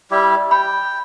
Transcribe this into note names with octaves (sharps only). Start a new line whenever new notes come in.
G3 E4 G4
G5 B5